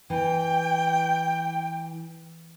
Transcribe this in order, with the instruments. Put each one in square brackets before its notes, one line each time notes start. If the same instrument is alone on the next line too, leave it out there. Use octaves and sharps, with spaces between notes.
[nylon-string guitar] E3 [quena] G5